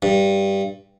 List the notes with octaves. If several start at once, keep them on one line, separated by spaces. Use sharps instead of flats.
G2